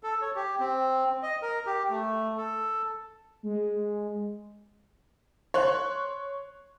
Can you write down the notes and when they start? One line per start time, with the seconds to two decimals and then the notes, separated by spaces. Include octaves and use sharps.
0.03 A4
0.22 C#5
0.36 G4
0.60 C4
1.23 D#5
1.42 A#4
1.66 G4
1.90 A3
2.37 A4
3.43 G#3
5.54 C#5 C6 F#6